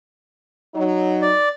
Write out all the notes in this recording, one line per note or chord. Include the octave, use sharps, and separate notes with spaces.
F#3 D#4
D5